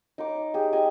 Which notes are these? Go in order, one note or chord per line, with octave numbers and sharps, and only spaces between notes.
D#4 C#5 D6
G4 G#4
G4 D#5 G#5